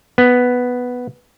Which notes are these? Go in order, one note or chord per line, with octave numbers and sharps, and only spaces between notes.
B3